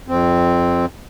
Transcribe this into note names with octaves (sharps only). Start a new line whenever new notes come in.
F2 C4